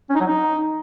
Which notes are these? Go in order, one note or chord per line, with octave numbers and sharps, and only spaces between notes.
C#4
D#4
F#3
D#4